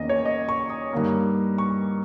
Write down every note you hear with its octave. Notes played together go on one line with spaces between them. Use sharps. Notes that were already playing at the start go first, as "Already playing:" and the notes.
Already playing: E2 D#3 A#3 C#4 D#5
C#5
D#5
C#6
D#6
G2 D#3 A#3
C#6